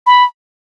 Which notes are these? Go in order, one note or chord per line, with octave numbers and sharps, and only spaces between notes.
B5